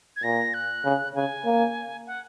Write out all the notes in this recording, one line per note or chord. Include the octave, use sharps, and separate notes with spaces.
G#6
A#2 A#6
F#6
C#3
C#3 G#5
A#3
F#5